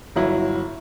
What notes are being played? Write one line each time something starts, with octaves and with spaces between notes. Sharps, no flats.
G1 F#3 E4